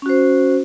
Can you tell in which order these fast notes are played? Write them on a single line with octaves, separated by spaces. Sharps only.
C#4 F#4 C5